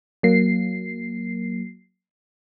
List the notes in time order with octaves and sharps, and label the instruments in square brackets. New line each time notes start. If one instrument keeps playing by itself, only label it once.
[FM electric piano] F#3 A#3 C7